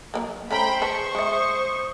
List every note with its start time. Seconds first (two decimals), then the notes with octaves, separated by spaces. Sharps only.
0.14 F#3 G#3 A#3
0.51 A3 C#4 C5 G5 A#5 B5
0.82 G#4 B4 A5 C#6
1.15 G#3 E5 D#6